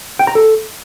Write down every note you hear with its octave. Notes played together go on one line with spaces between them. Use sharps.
G5
A#5
A4